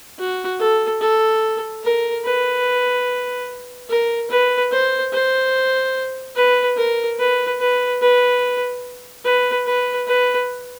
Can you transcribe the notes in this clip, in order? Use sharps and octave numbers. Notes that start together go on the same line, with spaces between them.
F#4
A4
A4
A#4
B4
A#4
B4
C5
C5
B4
A#4
B4
B4
B4
B4
B4
B4